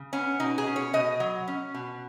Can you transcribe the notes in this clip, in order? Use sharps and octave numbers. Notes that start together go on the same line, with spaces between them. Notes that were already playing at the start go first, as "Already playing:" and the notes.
Already playing: C#3
B3 C#4
B2 D#4
G#4
C#4
C#5
B2 D#5
F#3
C#4
B2